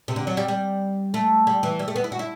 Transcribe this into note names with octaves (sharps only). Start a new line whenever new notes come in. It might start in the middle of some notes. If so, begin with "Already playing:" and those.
C3
D3
F#3
G3
G3
A3
G3
E3
G3
A3
B3
E4
F#4
E4